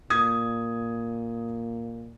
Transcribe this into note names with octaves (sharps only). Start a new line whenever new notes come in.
A#2 D#6 G#6